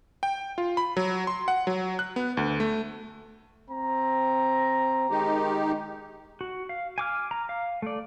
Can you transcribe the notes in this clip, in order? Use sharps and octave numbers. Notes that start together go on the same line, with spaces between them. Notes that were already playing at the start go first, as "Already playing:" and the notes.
G5
F4
B5
F#3
C6
F#5
F#3
F#6
B3
D2
A3
C4 A#5
D#3 G#3 D#4 G4
F#4
F5
G#5 D6 F6
A#5
F5
A3 D5